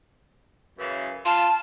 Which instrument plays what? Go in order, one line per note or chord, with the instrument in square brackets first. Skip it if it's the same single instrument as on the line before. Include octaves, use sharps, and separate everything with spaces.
[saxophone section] F#2 C#3 E3
[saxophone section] F4 [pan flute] A5